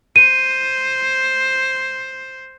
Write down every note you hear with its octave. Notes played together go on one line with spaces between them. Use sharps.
C5 D#7